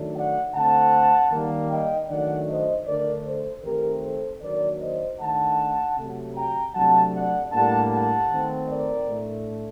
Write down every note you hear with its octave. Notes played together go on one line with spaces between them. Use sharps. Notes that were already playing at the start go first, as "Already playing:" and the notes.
Already playing: D#3 F#3 A3 D4
D5 F#5
D3 A3 C4 F#5 A5
D#3 G3 A#3
D#5 G5
D#3 F#3 A3 D4 D5 F#5
C5 D#5
D3 A3 D4 A#4 D5
A4 C5
D#3 A3 C4 G4 A#4
A4 C5
D#3 F#3 A#3 D4 A#4 D5
C5 D#5
D#3 A3 D4 F#5 A5
C3 F#3 A3
G5 A#5
C3 F#3 A3 D4 F#5 A5
D5 F#5
A2 G3 A#3 D4 F#5 A5
F#5 A5
D#3 A3 C4
A#4 D5
A2 A3 D4